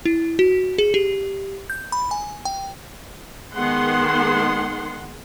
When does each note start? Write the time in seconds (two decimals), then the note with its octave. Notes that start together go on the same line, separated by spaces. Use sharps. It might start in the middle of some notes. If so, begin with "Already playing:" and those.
0.05 E4
0.39 F#4
0.78 G#4
0.94 G4
1.70 G6
1.92 B5
2.11 G#5
2.45 G5
3.54 D#3 G#3 B3 G#4 F#5 C6